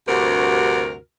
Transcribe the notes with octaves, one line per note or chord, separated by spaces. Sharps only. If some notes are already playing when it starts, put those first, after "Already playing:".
D2 G2 C3 F#4 A#4